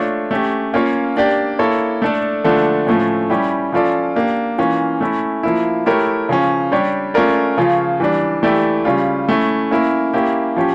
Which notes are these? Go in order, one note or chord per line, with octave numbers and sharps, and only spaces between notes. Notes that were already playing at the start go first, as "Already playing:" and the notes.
Already playing: A3 D4 F4 C#5
A3 C#4 G4
A#3 C#4 F4 C#5
A#3 D4 G4 D5
A#3 E4 A4 C#5
A3 D4 A4 D5
D3 F3 A3 D4 A4
A2 F3 A3 C#4
G3 C#4 E4 G4
F3 C#4 F4 A4 D5
A#3 D4 G4
E3 A#3 C#4 F4
A3 C#4 E4
F3 A#3 E4
A3 E4 G4 A#4 C#5
C#3 F3 C#4
G3 D4 G4 C#5
A3 C#4 F4 A#4 D5
C#3 F3 C#4 F4
E3 G3 D4
E3 A3 E4 G4 D5
C#3 G3 C#4 F4
A3 C#4 E4
A#3 C#4 E4 A#4
A#3 C#4 E4 G4
F3 C#4 G4